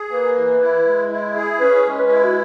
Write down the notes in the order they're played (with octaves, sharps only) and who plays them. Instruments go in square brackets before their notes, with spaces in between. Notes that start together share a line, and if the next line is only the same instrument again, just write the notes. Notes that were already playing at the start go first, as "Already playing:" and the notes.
Already playing: [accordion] G#4
[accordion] A#3 [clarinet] B4
[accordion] E3
E4
G#3
E4
G#4
[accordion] C#4 [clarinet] B4
[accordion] G#3
[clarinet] B4
[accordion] E4
[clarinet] F#4